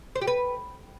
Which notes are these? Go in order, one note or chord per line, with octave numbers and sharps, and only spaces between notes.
C5
G4
B4